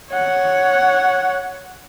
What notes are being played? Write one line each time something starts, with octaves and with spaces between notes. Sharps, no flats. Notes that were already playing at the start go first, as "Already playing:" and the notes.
C#5 F#5